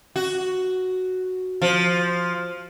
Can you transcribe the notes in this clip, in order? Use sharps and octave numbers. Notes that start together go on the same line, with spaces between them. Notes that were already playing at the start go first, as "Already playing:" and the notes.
F#4
F3